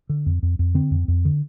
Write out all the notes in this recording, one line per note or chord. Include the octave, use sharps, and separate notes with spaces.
D3
F2
F2
F2
D3 C4
F2
F2
D3